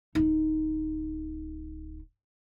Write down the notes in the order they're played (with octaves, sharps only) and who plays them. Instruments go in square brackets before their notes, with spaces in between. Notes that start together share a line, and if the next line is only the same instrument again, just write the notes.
[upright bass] D1 D#4